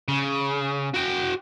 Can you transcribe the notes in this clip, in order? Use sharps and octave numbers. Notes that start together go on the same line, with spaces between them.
C#3
F#4 G5